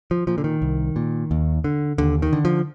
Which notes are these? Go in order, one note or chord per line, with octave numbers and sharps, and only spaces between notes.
F3
A#2 F3
D3
D#3
C2
A#2
D#2
D3
D#2 D3
D#3
D3
F3